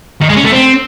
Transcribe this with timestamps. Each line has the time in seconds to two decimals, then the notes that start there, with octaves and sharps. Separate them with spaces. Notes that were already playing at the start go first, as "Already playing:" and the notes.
0.21 D#3
0.29 G#3
0.37 C#4
0.44 A3
0.52 C4